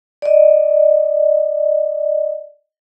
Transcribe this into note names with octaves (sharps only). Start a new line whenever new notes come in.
D5 D#5